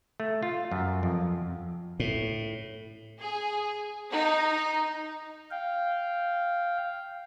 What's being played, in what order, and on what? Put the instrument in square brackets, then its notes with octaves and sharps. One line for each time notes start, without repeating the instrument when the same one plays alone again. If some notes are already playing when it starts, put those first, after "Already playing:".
[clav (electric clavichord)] A3
F4
F#2
F2
[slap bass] A2
[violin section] G#4
D#4
[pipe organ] F5 G5